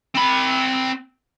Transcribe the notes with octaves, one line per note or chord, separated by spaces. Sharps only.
C4 B5